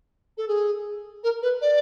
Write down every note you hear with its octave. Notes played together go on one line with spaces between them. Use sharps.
A4
G#4
A#4
B4
D5